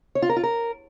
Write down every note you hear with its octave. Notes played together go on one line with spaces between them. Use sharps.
C#5
F4
A#4
F4
A#4